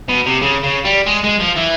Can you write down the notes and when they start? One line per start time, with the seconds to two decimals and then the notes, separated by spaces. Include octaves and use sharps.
0.09 B2
0.26 C3
0.42 C#3
0.63 C#3
0.85 G3
1.07 G#3
1.24 G#3
1.40 F3
1.56 E3